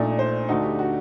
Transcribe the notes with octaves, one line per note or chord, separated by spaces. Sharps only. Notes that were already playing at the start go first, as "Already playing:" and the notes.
Already playing: A#1 A#2 A3 D#4 D5
C5
D2 D3 A3 D#4 F#4
G4
F#4